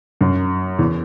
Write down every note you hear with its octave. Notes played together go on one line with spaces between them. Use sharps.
F#2
E2